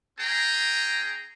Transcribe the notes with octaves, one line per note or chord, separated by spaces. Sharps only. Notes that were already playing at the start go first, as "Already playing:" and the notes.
C#4 G#4 G5 A#5